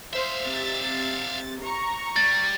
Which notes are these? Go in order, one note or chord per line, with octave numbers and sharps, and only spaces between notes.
C5 E5 F5
C3 A6
A#5 C#6
G3 A6